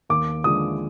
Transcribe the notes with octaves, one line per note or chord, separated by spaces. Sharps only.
D#2 D6
D3 F3 G#3 D#6